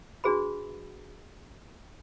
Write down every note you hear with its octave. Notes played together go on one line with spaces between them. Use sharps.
D4 F#4 G#4 B4 B5